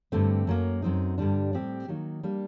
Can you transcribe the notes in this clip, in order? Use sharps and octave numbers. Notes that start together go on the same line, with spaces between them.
G2 D3 A3 C4
F#2 F#3 A#3
F#2 F#3 C4 D#4
G2 D3 G3 D4
A2 G3 C4 G4
D#3 F#3 A#3 D#4
G3 A#3 D4